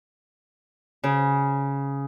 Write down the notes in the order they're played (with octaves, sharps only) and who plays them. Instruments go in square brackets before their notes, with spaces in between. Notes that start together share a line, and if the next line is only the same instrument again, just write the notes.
[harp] C#3